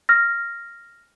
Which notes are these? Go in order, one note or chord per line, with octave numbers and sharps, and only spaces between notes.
F6 A#6